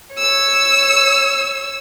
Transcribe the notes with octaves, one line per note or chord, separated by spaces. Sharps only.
C#5 E6